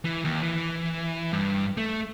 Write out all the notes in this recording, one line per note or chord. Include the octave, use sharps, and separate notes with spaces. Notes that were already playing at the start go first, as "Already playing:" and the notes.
E3
D#2
E3
G2
A3